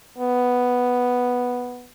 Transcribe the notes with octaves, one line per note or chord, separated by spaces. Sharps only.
B3